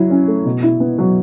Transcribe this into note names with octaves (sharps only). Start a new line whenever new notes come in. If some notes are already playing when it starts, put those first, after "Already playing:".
Already playing: F#3 E4
C#4
A3
B2
E4
B3
F#3